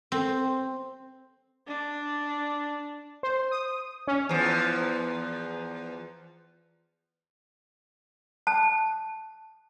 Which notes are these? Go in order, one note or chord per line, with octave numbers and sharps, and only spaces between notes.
C4
D4
C5
D#6
C#4
E2 F3
A5